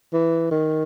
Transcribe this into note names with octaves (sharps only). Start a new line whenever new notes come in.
E3
D#3